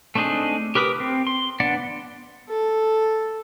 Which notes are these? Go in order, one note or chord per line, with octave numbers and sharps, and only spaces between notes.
A3 C4 D4 D#4 G#4
G4 A#4 B4 D6 D#6
C4
C6
B3 D4 D5 F#5
A4